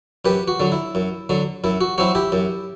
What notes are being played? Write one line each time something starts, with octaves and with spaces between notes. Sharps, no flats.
F#2 G4 B4
F#4
D3 F#3
E4
F#2
D3 F#3
F#2 E4
F#4
F#3 C4 E4 F#4
E4 G4
F#2